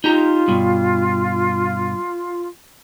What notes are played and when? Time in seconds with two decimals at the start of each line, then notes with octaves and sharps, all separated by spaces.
0.04 D#4 F4 G4 A#5
0.48 G2 B2